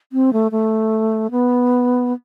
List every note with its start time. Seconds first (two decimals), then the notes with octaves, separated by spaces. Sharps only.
0.12 C4
0.33 A3
0.52 A3
1.31 B3